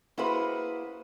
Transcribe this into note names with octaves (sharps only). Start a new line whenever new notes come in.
A#3 E4 F#4 G#4 B4 C5